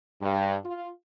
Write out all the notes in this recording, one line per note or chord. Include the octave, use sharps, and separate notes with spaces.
G2
F4